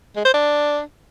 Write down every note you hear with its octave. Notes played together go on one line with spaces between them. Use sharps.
G#3
C5
D4